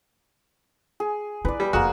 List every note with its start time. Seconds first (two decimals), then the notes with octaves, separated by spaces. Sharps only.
1.00 G#4
1.45 E4 B4 D5
1.60 G3
1.73 F1 F2 G#3 A#3 F#4